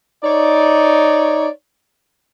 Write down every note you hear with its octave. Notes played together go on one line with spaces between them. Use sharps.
D#4 C#5 D5